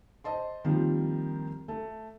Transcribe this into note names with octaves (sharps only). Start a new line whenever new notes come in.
C5 D#5 A5 C6
D#3 F3 G3 A#3 C4
A3